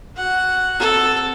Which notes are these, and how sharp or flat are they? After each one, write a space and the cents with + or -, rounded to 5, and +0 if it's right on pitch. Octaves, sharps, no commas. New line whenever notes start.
F#4 +0 F#5 +0
C4 +0 A4 +0